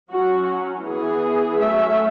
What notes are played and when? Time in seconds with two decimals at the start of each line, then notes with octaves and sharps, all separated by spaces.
0.11 F#3 C#4 F#4
0.85 E3 B3 G#4
1.60 F#3 A3 C#4 E5